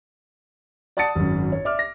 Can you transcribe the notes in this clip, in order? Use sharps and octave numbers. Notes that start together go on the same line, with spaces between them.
D5 F#5 A5 D#6 A6 C#7
G#1 F#2
C#5
D5 E5 D6 F6
A#6